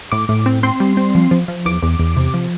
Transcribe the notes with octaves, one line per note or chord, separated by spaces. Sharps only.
A2 D6
A2
C4
C4 C6
G3
C4
F3
F3
F3
E2 D6
E2
E2
C3
F3